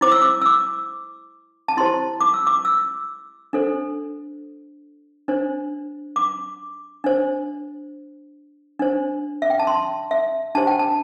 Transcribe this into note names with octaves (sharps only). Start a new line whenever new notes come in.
E4 C5 D6
E6
D6
E6
D6
A5
E4 G4 C5 C6
D6
E6
D6
E6
D4 A4 C5
D4 C5
D6
D4 C5
D4 C5
E5
G5
A5
C6
E5
D4 G4 C5 A5
G5
A5